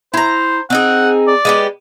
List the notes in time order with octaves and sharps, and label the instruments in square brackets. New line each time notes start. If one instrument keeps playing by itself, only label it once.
[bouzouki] E4 A#5 [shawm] C5
[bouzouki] C4 D#4 G#4 [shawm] F#5
[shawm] D5
[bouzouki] G#3 B3 G4